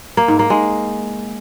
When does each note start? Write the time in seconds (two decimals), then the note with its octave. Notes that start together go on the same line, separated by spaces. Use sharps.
0.17 A#3
0.28 G#2
0.39 A#3
0.50 G#3